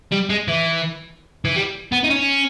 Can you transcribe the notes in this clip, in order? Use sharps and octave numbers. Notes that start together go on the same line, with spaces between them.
G3
G#3
E3
E3
G3
B3
D#4
C#4